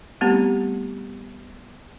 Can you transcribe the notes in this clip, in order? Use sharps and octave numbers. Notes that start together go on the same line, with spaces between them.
G3 A3 B3 C4 G4